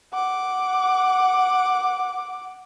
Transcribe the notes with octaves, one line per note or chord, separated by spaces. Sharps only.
F#5 D6